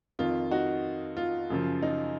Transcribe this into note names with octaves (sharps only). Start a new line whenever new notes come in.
F2 D#3 F4
D#4 F#4
F4
F#2 C#3 F3
D#4